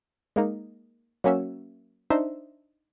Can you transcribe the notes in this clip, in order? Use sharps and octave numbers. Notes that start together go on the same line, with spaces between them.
G#3 A#3 D#4
F#3 A#3 C#4 F#4 E5
D4 D#4 C5 E5